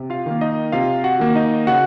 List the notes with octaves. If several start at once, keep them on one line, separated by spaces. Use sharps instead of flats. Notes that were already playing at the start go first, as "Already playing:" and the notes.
Already playing: C3
F4 F5
D#3 A#3
D#4 D#5
C3 F4 F5
F#4 F#5
D#3 A#3
D#4 D#5
C#3 F#4 F#5